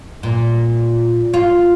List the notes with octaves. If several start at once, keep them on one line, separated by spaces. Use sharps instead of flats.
A#2
F4